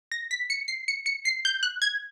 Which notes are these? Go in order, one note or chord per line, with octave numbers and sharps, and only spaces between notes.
A#6
B6
C#7
C7
C#7
C#7
C7
G6
F#6
G#6